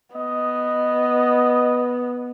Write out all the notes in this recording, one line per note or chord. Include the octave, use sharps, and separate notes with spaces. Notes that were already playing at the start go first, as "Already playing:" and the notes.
B3 D#5